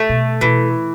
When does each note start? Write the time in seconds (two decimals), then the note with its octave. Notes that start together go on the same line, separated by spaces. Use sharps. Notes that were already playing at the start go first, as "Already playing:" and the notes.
Already playing: A3
0.09 B2
0.41 B2 E3